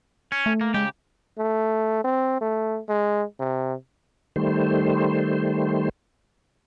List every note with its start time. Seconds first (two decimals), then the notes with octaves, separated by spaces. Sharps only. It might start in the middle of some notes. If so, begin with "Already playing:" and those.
0.32 C#4
0.46 A3
0.61 A#3
0.74 C#3 G#3 G4
1.38 A3
2.04 C4
2.41 A3
2.89 G#3
3.40 C3
4.36 D#3 G3 A3 C5